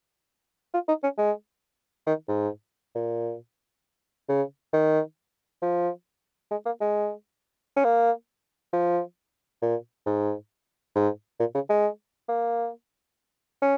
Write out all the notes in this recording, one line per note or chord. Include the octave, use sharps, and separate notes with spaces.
F4
D#4
C#4
G#3
D#3
G#2
A#2
C#3
D#3
F3
G#3
A#3
G#3
C#4
A#3
F3
A#2
G#2
G#2
A#2
C#3
G#3
A#3
C#4